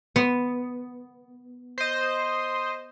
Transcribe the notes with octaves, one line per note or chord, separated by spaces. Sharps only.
B3
C5 D#5